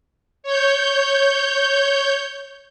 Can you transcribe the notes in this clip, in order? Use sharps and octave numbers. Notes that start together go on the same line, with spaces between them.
C#5 G6